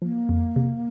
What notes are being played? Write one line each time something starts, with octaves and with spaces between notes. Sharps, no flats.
F3 A#3
F2
C3